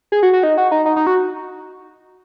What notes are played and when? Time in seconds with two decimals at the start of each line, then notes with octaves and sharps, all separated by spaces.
0.12 G#4
0.23 F#4
0.33 F#4
0.43 D#4
0.57 F#4
0.71 D#4
0.86 D#4
0.96 D#4
1.07 F#4